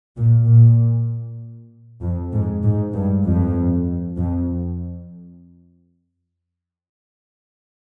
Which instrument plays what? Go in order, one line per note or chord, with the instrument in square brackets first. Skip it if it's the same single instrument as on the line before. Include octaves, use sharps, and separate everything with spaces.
[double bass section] A#2
A#2
F2
G#2
G#2
G2
F2
F2